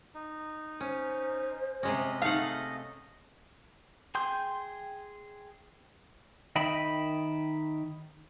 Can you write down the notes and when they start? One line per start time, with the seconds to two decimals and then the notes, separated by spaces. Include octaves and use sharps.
0.14 D#4
0.80 C#4 C5
1.83 C3 G#3 C#4 D#5
2.22 A3 D#4 F5 F#5
4.15 G#4 G5 C6 G6
6.55 D#3 D#5 E5 G5 B5